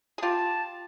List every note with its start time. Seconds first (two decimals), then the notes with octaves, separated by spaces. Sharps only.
0.18 G#4
0.22 F4 G4 A5